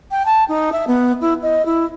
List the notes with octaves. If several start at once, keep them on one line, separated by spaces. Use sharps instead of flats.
G5
A5
D#4
E5
B3
E4
D#5
E4